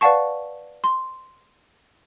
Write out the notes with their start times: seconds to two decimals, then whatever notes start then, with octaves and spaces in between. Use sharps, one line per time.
0.01 B4 D5 F5 F#5 A5 C#6
0.84 C6